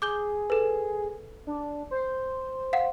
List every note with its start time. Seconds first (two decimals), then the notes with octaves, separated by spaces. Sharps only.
0.02 G#4 D6 G6 G7
0.50 A4 B4
1.47 D4
1.91 C5
2.73 F5 F#5